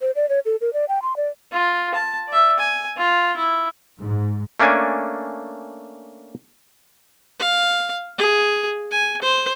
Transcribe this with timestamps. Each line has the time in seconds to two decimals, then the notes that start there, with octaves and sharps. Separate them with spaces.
0.01 C5
0.15 D5
0.29 C#5
0.46 A4
0.61 A#4
0.73 D5
0.89 G5
1.02 C6
1.17 D5
1.52 F4
1.94 A5
2.28 D5 E5
2.59 G#5
2.97 F4
3.37 E4
3.99 G#2
4.60 A3 A#3 C#4 D4 G#5
7.40 F5
8.18 G#4
8.91 G#5
9.22 C5